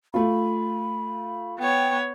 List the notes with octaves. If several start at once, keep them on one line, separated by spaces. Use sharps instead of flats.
A3 F4 B5
B3 C#5 G5